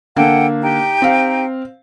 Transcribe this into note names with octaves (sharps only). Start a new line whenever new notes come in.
D3 A#3 A4 F#5 G5
D#4 G4 G5
C4 F5